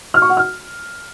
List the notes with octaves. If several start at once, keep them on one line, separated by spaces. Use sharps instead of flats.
F6
C#6
F#5
F6